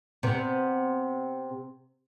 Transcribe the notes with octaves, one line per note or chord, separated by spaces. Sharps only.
C3 B3